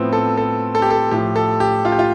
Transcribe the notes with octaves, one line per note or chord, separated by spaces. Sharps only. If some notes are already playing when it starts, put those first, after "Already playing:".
Already playing: A2 F3 B3 C4
A4
A4
A4
G4
A4
A2 F3 G4
A4
G4
F4
G4
F4